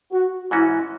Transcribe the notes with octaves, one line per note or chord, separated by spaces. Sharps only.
F#4
G#2 E3 C#4 E4 F#4